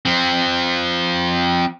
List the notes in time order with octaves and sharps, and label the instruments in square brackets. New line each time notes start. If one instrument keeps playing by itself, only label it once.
[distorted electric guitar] F3 C4